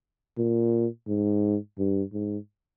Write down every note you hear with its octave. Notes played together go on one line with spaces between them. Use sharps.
A#2
G#2
G2
G#2